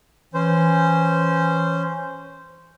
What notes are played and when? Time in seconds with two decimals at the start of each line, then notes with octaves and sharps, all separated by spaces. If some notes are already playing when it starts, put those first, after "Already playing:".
0.34 E3 C#4 C5